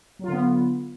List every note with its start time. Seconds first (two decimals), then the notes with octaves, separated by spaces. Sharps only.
0.19 F#3
0.24 F4
0.28 D3
0.33 B3